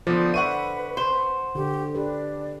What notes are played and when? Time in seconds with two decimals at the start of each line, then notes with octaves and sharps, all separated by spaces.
0.07 D3 F3 B3 C5
0.34 B4 E5 F#5 C#6 D#7
0.97 C5
1.55 D3 G4
1.95 D4 G4 B4